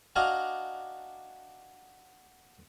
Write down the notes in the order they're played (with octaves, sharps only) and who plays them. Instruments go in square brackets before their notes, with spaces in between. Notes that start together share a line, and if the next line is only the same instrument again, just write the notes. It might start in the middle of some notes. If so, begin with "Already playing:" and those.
[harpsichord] D4 D#4 F#4 F5 G#5 A#5